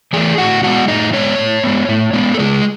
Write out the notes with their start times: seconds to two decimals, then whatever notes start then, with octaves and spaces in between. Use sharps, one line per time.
0.13 E3 A3 G#4 G#5
0.38 A2 F#4 F#5
0.63 G#3 B3 F#4 F#5
0.88 A2 D#4 D#5
1.13 G#3 B3 C#4 C#5
1.38 A2
1.64 G#3 B3
1.89 A2
2.13 G#3 B3
2.34 A4
2.39 C#3 G#3 G#4